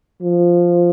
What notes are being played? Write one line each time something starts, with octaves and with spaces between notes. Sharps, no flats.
F3